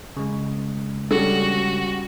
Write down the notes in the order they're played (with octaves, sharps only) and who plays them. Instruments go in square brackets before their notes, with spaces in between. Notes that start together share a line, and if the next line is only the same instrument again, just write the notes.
[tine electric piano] C#3 G#3
[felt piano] G3 C#4 [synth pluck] D4 G#4 A4 [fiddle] F#4